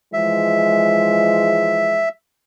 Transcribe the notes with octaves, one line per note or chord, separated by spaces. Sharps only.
E3 F3 G#3 E5